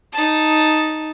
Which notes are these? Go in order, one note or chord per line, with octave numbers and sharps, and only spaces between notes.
D#4 A5